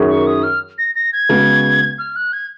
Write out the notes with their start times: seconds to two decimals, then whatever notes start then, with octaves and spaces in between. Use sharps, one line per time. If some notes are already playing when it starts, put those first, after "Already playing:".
Already playing: F#2 D#3 F#3 C#4 G#4
0.09 C#6
0.27 D#6
0.43 F6
0.78 A#6
0.95 A#6
1.13 G#6
1.29 C#3 G#3 B3 F#4
1.99 F6
2.16 F#6
2.33 G#6